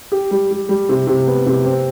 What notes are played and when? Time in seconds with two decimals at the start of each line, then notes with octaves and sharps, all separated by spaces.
0.12 G4
0.31 G3
0.51 G3
0.69 G3
0.89 C3
1.07 C3
1.27 B3
1.46 C3
1.65 C4